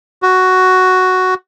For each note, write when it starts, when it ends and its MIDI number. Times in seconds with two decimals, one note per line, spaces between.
0.23 1.34 66